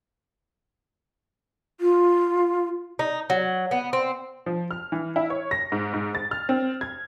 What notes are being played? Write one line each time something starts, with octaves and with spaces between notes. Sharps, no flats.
F4
D#4
F#3
B3
C4
F3
F6
E3
E4
C#5
A#6
G#2
G#2
A6
F6
C4
G#6